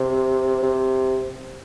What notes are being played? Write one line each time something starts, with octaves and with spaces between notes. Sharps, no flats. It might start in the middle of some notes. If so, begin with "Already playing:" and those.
Already playing: C3
C3